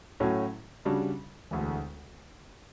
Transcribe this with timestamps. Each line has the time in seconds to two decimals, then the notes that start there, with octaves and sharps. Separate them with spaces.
0.20 A2 F#3 A3 C#4 F#4
0.85 C#3 G3 D4 F#4
1.51 E1 D2 D3